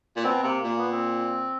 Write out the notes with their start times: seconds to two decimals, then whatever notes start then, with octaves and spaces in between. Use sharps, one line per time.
0.16 A#2
0.24 B2 C4
0.43 C3 A#3
0.64 A#2 A#3
0.78 B3
0.91 C4